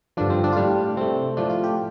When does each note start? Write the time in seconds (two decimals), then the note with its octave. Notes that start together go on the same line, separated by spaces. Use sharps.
0.17 G2 D3 F3 D4
0.30 C4
0.44 D4
0.52 F4
0.57 A2 G3 D4
0.97 C3 A3 C4
1.37 A2 F3 A3 D4
1.50 F4
1.64 G4